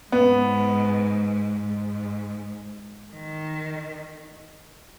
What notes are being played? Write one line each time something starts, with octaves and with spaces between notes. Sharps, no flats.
G#2 B3
G#2
D#3